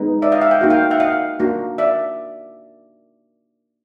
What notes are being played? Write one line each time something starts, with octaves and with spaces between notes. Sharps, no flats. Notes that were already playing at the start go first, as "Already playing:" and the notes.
Already playing: G#3 B3 D#4
D5 E5
D#5 F5
E5 F#5
F5 G5
A#3 D#4 F#4
F5 G5
E5 F#5
D#5 F5
A#3 D4 F#4
D5 E5